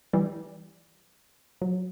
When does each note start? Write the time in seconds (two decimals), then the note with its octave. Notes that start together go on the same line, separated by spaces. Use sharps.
0.13 E3 G3
1.62 F#3